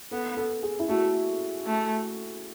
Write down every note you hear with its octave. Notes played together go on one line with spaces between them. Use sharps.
B3 A4
A4
G#4
E4
A3 F#4
A3